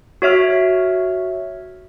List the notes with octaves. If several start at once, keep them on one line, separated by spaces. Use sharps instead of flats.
F#4 C#5 E5 F6